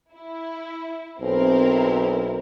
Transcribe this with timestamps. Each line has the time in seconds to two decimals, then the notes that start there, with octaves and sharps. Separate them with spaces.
0.14 E4
1.21 B1 C4 E4 A#4